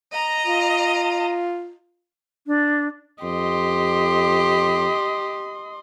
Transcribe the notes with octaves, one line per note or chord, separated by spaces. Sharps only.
D#5 A#5
F4
D4
F2 G4 D#5 C6